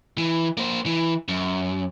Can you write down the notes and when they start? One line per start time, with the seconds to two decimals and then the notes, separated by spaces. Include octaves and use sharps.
0.18 E3
0.57 A#3 C5
0.86 E3
1.28 F#2